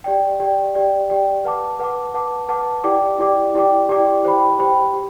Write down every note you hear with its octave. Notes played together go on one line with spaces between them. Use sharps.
G4 D5 G5
G4 D5 G5
G4 D5 G5
G4 D5 G5
B4 F#5 A5 D6
B4 F#5 A5 D6
B4 F#5 A5 D6
B4 F#5 A5 D6
E4 G4 D5 G5 D6
E4 G4 D5 G5 D6
E4 G4 D5 G5 D6
E4 G4 D5 G5 D6
G4 C5 G5 B5
G4 C5 G5 B5
G4